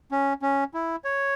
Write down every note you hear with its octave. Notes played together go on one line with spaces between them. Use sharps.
C#4
C#4
E4
C#5